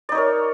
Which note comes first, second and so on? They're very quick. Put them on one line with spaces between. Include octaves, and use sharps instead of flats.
D5 D#4 C#5 A#4